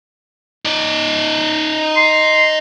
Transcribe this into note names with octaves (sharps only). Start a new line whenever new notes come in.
D#4 D5
C6